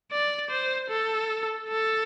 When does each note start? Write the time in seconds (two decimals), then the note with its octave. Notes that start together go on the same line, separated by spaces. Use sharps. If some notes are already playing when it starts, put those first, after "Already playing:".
0.11 D5
0.50 C5
0.90 A4
1.69 A4